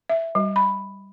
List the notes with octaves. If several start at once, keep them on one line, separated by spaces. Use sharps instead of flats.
E5
G3
B5